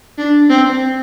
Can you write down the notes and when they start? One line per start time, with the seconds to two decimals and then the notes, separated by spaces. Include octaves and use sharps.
0.18 D4
0.50 C4